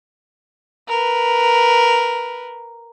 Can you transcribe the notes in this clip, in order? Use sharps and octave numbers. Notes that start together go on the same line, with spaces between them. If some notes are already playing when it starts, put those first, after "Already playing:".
A#4 B4